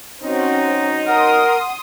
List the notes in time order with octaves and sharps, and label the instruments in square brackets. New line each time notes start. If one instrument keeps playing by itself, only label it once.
[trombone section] F#3 D#4 [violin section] C4 C#4 F#4
[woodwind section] A#4 [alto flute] F#5 [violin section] C6 D#6